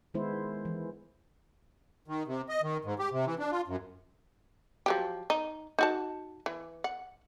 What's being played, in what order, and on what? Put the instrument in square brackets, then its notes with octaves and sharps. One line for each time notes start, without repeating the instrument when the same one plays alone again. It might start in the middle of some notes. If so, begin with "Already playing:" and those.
[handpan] D#3 G#3 B3 E4 C5
E3
[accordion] D#3
C3
D#5
D#3
G#2
G4
C3
E3
D4
F4
F#2
[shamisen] F3 F#3 G4
D#4
D#4 F#4 A5
E3
F#5